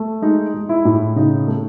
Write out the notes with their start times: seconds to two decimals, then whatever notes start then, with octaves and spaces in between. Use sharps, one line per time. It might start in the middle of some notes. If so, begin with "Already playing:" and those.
Already playing: A3
0.22 G#3 D#4
0.54 G#3
0.69 E4
0.85 A2
1.16 C#3 D#4
1.48 A3